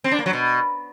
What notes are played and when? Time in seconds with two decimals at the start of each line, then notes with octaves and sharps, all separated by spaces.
0.04 C4
0.12 D4
0.19 A#3
0.26 F#3
0.33 B2